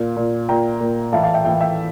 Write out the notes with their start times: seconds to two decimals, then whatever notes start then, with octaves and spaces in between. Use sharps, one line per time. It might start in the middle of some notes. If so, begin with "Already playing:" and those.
Already playing: A#2 F5
0.16 A#2
0.49 A#2 G5 A#5
0.80 A#2
1.12 A2 E3 F5 A5
1.23 F5 A5
1.34 E5 G5
1.45 A2 E3 E5 G5
1.61 E5 G5